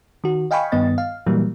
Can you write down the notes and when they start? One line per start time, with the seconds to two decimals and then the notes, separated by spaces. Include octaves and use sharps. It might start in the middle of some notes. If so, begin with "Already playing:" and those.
0.24 D#3 F#4
0.51 D#5 F5 G5 G#5 B5 C#6
0.72 G2 D#3 B3 D#5 A6
0.98 F5
1.26 A#2 E3 F#3 G3 A#3